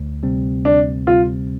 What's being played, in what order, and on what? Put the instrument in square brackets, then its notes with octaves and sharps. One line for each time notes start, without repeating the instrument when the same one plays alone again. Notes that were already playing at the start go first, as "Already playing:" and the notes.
Already playing: [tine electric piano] D2
C3 G3 C4
[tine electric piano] D2 [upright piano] D4
[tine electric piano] C3 G3 C4 [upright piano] F4